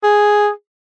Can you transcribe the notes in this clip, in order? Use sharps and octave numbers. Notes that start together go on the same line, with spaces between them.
G#4